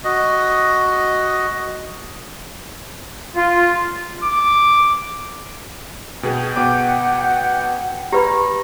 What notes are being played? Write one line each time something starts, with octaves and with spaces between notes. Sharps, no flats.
F#4 D#5
F4
D6
B2 B3 G#4 G5
B2 B4 F#5 D6
G4 B4 A#5 B5